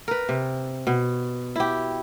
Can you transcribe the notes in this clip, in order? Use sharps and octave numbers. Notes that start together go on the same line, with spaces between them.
A#4 B4
C3
B2
E4 G4